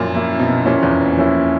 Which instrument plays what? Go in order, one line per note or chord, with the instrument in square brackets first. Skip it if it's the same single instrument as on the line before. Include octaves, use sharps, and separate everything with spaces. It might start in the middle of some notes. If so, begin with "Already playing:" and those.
Already playing: [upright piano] F#2 A#2 [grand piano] F3 A#3 C#4 E4
[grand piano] F3 A#3 C#4 E4
[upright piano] B2
[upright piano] A#2 [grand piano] F3 A#3 C#4 E4
[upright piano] E2
F2
[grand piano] F3 A#3 C#4 E4